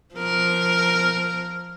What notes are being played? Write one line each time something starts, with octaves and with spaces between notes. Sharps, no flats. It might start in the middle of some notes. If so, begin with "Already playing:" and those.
F3 A#4